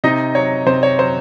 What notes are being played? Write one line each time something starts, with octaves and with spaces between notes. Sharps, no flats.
C3 D#4 D#5
F#3 C#5
C3 C5
C#5
F#3 C5